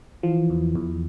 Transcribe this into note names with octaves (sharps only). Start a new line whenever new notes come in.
E3 F3
E2
E2